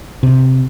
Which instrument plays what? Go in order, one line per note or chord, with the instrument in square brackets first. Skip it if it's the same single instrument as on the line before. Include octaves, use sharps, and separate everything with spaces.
[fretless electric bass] C3